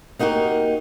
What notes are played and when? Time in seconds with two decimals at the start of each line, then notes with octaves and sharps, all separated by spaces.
0.19 A#3 D#4 F#4 G4 A#4